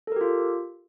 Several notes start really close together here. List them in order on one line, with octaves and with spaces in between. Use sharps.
A4 A#4 G4 F4